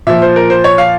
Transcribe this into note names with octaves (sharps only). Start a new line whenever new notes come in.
A#2 F3 E5
C5
A#4
C5
C#5
F5